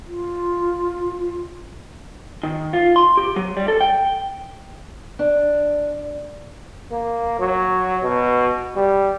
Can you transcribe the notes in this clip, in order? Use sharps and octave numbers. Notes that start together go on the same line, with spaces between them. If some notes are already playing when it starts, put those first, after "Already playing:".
F4
D#3
F4
C6
G4
F#3
G3
A4
G5
D4
A#3
F#3
B2
G3